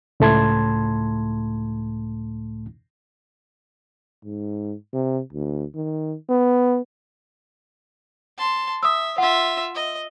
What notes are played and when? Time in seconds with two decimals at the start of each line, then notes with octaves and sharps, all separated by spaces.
0.20 C#2 A2 A3 A5 C6 G#6
4.25 G#2
4.93 C3
5.33 D2
5.75 D#3
6.29 B3
8.38 A5 C6
8.83 E5 D#6 E6
9.18 F4 E5 F#5
9.75 D#5